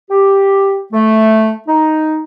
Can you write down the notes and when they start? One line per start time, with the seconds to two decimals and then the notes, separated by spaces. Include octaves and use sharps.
0.10 G4
0.92 A3
1.68 D#4